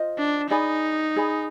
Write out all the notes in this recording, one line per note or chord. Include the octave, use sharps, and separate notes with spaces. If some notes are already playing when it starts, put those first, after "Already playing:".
Already playing: F4 C5 D#5
D4
D#4 G#4 D5 G#5 B5
G#4 D5 G#5 B5